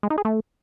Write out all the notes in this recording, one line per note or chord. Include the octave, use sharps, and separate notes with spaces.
G#3
D#4
G#4
A3